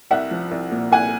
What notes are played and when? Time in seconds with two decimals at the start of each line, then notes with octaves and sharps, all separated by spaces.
0.11 C2 E5 F#5
0.31 F3
0.51 C2
0.71 A#2
0.92 C2 F#5 G#5